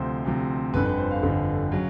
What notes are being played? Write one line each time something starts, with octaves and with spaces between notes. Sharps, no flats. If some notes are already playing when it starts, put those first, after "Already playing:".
Already playing: D2 C3 F3 C5
D2 C3 F3
G1 F2 D3 B4
B4
C5
F5
G1 F2 D3
C#3 F#3